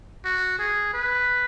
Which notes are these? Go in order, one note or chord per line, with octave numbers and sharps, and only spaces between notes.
F#4
G#4
B4